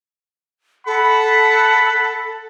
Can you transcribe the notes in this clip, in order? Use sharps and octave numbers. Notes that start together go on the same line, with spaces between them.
A4 F#5 B5